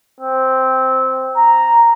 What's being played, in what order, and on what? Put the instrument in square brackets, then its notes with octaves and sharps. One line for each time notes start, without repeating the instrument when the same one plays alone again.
[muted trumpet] C4
A#5